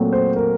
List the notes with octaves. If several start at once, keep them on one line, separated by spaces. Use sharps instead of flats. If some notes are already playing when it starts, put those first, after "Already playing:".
Already playing: A#2 F#3 A3 C4
C5
A#4